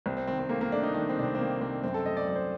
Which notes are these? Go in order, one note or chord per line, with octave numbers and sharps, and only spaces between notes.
C2 C4
C4
D#3 C4
C4
A3 A#3
A#3
A3 D4
D#4
D#3 D4
C4
C3 D4
C4
C4
D#3 A#3
C2 C4
F#2 C4
A4
A3 D#5
D5
F#3 D5
C5